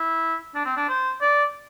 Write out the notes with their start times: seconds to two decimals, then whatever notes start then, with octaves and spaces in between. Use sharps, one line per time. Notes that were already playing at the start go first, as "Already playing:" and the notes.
Already playing: E4
0.55 D4
0.66 C4
0.77 D4
0.89 C5
1.21 D5